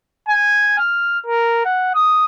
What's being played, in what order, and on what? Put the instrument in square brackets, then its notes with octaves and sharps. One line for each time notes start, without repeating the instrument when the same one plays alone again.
[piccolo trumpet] G#5
F6
A#4
F#5
D#6